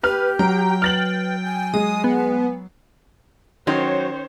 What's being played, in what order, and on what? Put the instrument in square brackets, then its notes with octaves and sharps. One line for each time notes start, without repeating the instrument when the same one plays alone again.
[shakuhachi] G4 [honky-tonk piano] B4 F6
[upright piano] F#3 [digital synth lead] G5 [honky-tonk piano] A#5
[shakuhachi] B4 [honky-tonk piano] F6 A6 F#7
[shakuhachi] G#5
[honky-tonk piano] G#3 [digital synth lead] D#6
[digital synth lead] B3
[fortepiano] D#3 C6 [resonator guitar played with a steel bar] F#3 [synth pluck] C#4 G5 C7 [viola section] C5 C#5